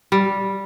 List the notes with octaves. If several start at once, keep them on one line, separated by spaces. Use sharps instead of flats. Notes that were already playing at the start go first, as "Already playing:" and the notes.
G3